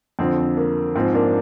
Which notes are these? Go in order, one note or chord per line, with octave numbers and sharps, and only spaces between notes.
F2 D3 F3 C4
C4
A#3
G#2 F3 C4
A#3 D4